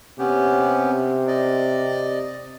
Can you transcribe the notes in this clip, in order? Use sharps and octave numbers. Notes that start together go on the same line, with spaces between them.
C3 B3 C#4 G4
D5 D#5